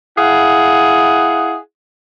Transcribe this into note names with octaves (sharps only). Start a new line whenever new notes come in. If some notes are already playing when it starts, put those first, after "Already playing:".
E4 G#4 F5 F#5